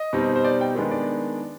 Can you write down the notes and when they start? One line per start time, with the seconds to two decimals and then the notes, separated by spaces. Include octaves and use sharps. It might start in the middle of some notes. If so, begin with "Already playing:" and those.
Already playing: D#5
0.13 B2 G3 C4 D#4
0.36 C5
0.44 D5
0.61 G5
0.75 D#3 G#3 B3 D4
0.91 D5